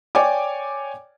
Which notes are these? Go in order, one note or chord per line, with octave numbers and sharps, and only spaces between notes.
C#5 D5 G5 G#5 D6